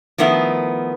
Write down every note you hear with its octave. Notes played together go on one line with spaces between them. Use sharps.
D#3 F3 A3 B3 E4